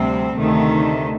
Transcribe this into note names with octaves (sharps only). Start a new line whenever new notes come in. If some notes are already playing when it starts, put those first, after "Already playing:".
Already playing: D2 C3 G3 C4
D2 C3 D#3 A3